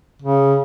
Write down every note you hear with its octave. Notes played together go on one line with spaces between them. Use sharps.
C#3